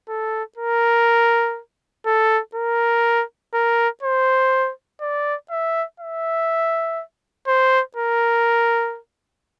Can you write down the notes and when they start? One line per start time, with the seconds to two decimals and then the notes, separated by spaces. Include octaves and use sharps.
0.09 A4
0.57 A#4
2.06 A4
2.55 A#4
3.54 A#4
4.03 C5
5.01 D5
5.50 E5
6.00 E5
7.47 C5
7.96 A#4